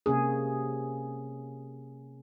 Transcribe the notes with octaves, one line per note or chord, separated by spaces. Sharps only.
C3 A#3 C#4 G#4